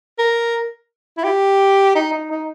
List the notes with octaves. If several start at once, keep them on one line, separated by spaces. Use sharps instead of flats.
A#4
E4
G4
D#4
D#4
D#4